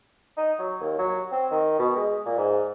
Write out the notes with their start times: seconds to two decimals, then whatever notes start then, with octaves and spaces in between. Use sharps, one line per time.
0.37 D#4
0.59 F#3
0.81 D#2
0.98 F#3
1.32 C4
1.51 D#3
1.79 B2
1.96 G#3
2.26 A#2
2.38 G#2